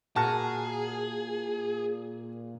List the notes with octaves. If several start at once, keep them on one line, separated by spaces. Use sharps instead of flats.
A#2 F#4 G#4 A#4 F#5 A5